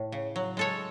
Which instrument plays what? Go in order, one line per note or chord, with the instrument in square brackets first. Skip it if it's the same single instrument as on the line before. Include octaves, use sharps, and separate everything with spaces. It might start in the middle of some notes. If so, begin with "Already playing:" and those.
Already playing: [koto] A2
C#3
F#3
G#3 A4 C#5